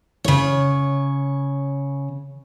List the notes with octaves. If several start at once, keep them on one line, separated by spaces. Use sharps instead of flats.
C#3 C#5